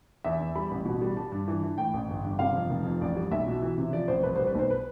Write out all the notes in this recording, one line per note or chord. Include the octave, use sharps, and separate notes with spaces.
E2 E5
E2
G3 B5
A1
B2
G3
G3 A5
G2
E3
E3
A2 G5
A1
G1
G2
C3 F5
F2
F1
F2
A1 D5
G3
B1 E5
B2
E3
C3
F3 D5
A1 C5
C2 B4
G3 C5
B4
B1 C5
B4